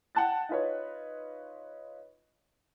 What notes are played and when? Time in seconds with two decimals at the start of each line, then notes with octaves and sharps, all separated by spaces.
0.15 F#5 G5 A5 F#6 A6
0.49 D#4 F4 B4 C#5